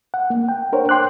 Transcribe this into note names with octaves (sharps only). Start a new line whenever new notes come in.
F#5
A#3
G5
D4 A#4 C5 C#5
G5 C6 D6 F#6